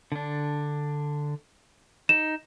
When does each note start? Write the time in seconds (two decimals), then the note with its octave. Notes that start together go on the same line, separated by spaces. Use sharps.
0.12 D3 D4
2.09 D#4 E7